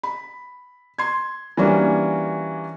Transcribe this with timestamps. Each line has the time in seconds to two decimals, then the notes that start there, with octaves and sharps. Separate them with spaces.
0.03 B5
0.98 C6 G#6
1.57 E3 G3 A#3 C#4 D4 F#4